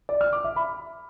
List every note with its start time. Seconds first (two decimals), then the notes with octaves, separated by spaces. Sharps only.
0.09 D5
0.21 F6
0.33 D6
0.44 E5
0.56 B5